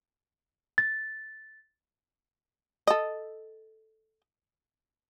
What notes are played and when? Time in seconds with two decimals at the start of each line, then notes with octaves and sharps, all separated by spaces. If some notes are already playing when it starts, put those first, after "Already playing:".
0.78 A6
2.87 A4 D#5